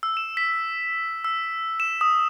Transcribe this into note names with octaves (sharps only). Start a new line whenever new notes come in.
E6
E7
B6
E6
E7
D#6